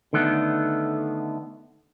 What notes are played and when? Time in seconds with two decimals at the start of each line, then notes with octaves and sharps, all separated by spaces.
0.13 D3 D#3 A3 B3